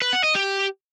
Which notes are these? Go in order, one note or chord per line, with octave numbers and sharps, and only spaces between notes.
B4
F#5
D#5
G4